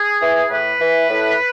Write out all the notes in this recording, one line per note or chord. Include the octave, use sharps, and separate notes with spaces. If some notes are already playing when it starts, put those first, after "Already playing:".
Already playing: G#4
E3
A2 B4
E3
A2